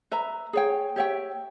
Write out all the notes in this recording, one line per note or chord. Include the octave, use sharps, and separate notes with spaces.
B4 E5 A#5
G#4 C#5 G5
G4 C#5 E5 G5